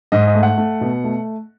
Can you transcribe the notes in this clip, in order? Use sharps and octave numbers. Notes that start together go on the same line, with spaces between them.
G#2 D#5
D#5
A3
F#5
A3
B2
A3